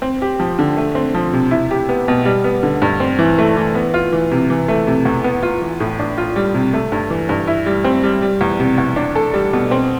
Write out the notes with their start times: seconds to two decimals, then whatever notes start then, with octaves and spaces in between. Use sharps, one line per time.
0.02 C4
0.22 G4
0.40 F3
0.59 D3
0.77 A3
0.95 C4
1.15 F3
1.33 C3
1.51 E4
1.71 G4
1.89 B3
2.08 B2
2.25 G3
2.44 B3
2.63 D3
2.82 G2
3.00 C4
3.19 E3
3.38 A3
3.57 E3
3.75 B3
3.94 F4
4.12 E3
4.31 C3
4.50 E3
4.68 A3
4.87 C3
5.05 E2
5.24 B3
5.43 F4
5.62 E3
5.80 A2
5.99 D4
6.18 F4
6.36 G3
6.54 C3
6.73 A3
6.92 G2
7.10 E3
7.29 G2
7.48 E4
7.66 G3
7.84 C4
8.03 G3
8.22 G3
8.41 E2
8.60 C3
8.78 E2
8.96 D4
9.15 A4
9.34 G3
9.53 B2
9.71 C4